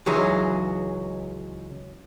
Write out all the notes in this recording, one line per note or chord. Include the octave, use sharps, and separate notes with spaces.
C#2 E3 F#3 D#4 G#4 E5